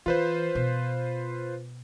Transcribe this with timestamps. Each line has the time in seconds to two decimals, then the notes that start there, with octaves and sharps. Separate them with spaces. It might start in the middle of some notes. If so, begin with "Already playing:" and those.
0.06 E3 F4 B4 C5
0.55 B2